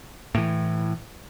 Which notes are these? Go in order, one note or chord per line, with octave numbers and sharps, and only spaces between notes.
A2 E3